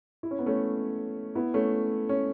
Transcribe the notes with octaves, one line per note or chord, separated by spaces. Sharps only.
E4
C#4
B3
A3 C#4
B3 E4
A3 C#4
C#4